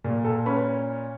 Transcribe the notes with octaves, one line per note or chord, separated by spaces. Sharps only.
A#2
A4 A5
C#4 B4 B5